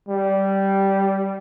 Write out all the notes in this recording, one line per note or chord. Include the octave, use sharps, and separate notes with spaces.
G3